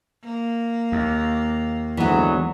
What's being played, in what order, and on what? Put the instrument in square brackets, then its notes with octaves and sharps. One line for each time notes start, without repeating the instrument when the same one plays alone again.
[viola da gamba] A#3
[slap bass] D#2
[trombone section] G#2 D3 F#3 [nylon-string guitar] E3 B3